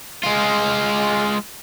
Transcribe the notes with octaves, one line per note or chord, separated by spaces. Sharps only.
G#3 F4